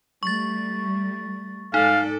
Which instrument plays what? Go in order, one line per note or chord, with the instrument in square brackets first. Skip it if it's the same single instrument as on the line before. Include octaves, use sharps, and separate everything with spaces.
[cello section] G3 A3 [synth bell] C#6 A6
[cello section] G#2 A4 D5 [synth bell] D#4 [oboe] F5